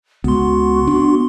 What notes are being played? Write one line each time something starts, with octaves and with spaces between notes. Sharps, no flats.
C#2 B3 F#4 C6
D4